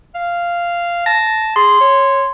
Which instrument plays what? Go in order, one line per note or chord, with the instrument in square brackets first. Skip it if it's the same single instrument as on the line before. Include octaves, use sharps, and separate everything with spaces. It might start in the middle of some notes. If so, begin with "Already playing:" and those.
[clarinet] F5
[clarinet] A5 [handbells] A#6
[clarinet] G#4 [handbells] C6
[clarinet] C#5